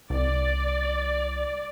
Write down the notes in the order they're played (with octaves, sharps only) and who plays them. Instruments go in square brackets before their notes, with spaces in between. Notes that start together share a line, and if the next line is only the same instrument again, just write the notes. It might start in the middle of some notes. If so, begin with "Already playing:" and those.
[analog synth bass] C2 [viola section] D5